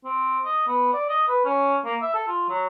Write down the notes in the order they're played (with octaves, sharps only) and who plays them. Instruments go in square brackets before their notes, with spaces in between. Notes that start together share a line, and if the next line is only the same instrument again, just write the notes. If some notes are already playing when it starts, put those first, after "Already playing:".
[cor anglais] C4
D#5
B3
D5
D#5
B4
C#4
A#3
E5
A4
F4
F#3